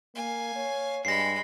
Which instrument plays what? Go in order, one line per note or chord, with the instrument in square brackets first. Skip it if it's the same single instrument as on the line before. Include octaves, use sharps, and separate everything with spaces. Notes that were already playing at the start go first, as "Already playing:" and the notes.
[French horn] A#3 [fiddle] F5 G#5
[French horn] C#5
[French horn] G2 [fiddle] G#3 B5 [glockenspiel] A#6 C7